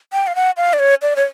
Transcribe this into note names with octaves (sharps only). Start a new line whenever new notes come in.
G5
F5
F#5
F5
D5
C#5
D5
C#5